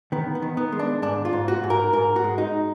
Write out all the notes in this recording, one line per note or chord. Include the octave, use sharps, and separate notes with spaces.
D#3 B3
B3
D#3
B3
G#3
D4
G#2 D4
F4
G#2
F#4
G#2
A#4
G#2 A#4
F#4
G#3
D#4